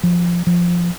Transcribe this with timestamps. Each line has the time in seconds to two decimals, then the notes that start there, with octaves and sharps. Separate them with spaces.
0.03 F3
0.47 F3